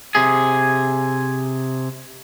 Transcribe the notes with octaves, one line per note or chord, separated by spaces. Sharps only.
C3 G#4